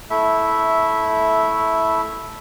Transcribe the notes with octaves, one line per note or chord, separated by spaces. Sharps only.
A3 E4 E5